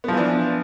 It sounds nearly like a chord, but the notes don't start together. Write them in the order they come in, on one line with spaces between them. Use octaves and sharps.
B3 F3 E3 D4